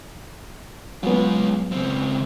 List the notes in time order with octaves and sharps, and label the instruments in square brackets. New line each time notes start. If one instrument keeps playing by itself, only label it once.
[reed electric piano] F#3 B3 [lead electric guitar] G#3 F4
[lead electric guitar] C#2 C4